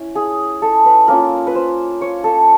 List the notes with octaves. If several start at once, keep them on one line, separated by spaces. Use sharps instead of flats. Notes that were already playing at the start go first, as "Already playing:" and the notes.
Already playing: C#4 E4
G#4
A4
B4
A#3 C#4 F4 A#4
B4
C5
C#5
A4